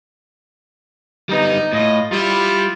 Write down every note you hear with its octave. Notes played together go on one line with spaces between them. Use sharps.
G3 B3 D#4
A2 F4 D#5
G3 E4 F4